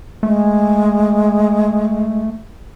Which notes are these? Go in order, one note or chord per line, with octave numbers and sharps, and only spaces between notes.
G#3 A3